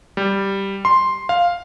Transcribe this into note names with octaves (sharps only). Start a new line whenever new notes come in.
G3
C6
F5